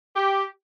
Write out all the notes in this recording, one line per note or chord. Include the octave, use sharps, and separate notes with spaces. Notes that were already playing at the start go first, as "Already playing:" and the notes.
G4